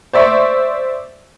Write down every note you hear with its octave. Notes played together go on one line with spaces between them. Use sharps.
C5 D5 E5 C6 C#6